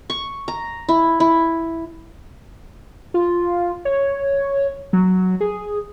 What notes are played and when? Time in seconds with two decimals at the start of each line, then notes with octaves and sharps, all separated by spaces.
0.10 C#6
0.48 A#5
0.89 E4
1.20 E4
3.14 F4
3.85 C#5
4.93 F#3
5.41 G#4